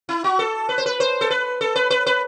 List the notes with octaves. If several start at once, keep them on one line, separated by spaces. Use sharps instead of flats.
E4
F#4
A4
B4
C5
B4
C5
A4
B4
A4
B4
B4
B4